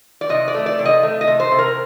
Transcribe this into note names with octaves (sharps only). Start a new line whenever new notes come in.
D5
C3 D#5
D5
A3
D5
C3
D#5
A3
D#5
C3
C5
C3
A#4